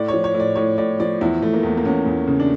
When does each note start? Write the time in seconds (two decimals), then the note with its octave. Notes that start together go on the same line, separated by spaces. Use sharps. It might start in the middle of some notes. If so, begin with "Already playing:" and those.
Already playing: A2 D5
0.08 F3 C#5
0.24 C#5
0.35 A2
0.40 D5
0.56 A2 C#5
0.78 A2 D5
0.99 F3 D5
1.21 E2 E4
1.42 E2 A3
1.53 A#3
1.63 E2
1.77 A#3
1.85 E2 C#4
2.06 E2
2.28 C#3
2.40 D4